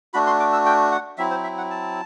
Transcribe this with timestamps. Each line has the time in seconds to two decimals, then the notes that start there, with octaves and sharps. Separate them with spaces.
0.14 A3 D4 F#4 B5
0.27 C6
0.40 D6
0.53 E6
0.66 G5
0.92 F#5
1.18 F#3 C4 E4 E5
1.31 C5
1.44 E5
1.58 F#5
1.70 A5